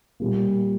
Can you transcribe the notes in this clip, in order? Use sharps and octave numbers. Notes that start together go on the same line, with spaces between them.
A#2 G3 A#3